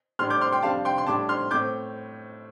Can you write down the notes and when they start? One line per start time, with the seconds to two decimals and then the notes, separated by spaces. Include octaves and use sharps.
0.19 A2 G3 D4 C6 F6
0.30 D6 G6
0.41 C6 F6
0.52 G5 C6
0.63 F2 C3 G3 D4 F5 A5
0.85 G5 C6
0.98 C6
1.06 A2 G3 D4 A5 D6
1.29 C6 F6
1.51 A2 A3 C4 D6 G6